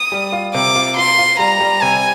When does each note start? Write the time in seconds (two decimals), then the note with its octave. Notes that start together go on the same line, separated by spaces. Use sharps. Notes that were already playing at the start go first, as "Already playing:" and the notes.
Already playing: D#6
0.12 G3
0.32 F4
0.55 C3 D6
0.75 F4
0.97 F4 C6
1.18 F4
1.39 G3 A#5
1.60 G3
1.82 C3 G#5